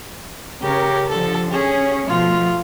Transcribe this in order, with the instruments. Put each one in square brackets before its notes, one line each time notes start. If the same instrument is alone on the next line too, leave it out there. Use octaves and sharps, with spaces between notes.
[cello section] C#3 A#4 C#5 [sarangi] G4
[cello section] D3 F3 [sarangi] A4
[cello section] C#4 C#5 [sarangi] G#4
[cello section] B2 F3 A3 [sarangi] F4